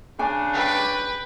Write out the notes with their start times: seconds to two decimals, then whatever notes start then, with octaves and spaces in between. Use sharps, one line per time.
0.19 C#3 D4 G#5
0.54 B4 G5